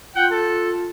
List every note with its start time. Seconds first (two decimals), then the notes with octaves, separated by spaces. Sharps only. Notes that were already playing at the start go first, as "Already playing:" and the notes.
0.15 F4 F#5 G5
0.31 A4